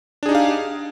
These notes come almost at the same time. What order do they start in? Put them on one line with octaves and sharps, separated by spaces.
D4 G#4 D#4 G4 F5